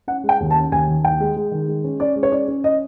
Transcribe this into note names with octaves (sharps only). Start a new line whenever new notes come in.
C#4 F#5
G#3
G5
D#2
A5
C#4
D#2 G#5
D#3
D#2 G5
G#3
G#3
D#3
G#3
C#4
C#4 D5
G#3
C#5
C#4 D5
C#4
D#5